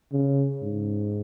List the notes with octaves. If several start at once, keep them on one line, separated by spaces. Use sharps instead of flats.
C#3
G#2